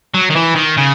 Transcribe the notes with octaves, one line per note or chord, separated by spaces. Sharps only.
F#3
D#3
E3
D#3
C#3